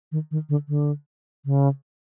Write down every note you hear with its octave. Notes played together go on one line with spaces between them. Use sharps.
D#3
D#3
D3
D3
C#3